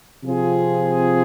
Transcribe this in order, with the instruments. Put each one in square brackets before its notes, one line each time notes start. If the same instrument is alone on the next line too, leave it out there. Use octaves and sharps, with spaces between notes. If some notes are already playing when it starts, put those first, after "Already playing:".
[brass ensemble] C3 F3 C4 F4 G#4